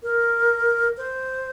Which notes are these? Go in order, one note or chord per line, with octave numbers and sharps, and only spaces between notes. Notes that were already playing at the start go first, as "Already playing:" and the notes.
A#4
C5